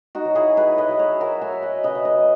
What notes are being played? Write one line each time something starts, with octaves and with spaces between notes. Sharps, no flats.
D#4 F#4
F#3
E4 G#4
F#3 G#4 B4
B4 D#5
F#3
C#5 E5
F#3 F#4 A#4
E5 G#5
F#3
D#5 F#5
C#3 B4 D#5
E5
D#5 F#5
F#3